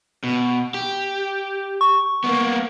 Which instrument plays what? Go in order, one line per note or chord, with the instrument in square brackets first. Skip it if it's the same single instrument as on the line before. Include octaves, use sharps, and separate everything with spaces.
[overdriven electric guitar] B2
G4
[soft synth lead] C#6
[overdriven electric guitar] A#3 B3